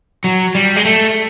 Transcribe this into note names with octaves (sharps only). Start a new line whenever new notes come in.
F#3
G3
G#3
A3